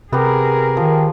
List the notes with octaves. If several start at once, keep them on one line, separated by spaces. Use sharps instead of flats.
C3 B3 G4 G#4 A#4
D#3 F3